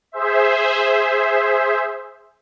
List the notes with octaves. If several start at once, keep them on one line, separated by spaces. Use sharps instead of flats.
G#4 C5 E5